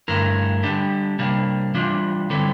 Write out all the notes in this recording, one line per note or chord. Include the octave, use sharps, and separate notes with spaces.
G2 D3 A3 E4 A#4
D3 G3 D4 G4
C3 G3 A#3 D4
E3 G3 D4 F4
D3 G3 C4 E4 A4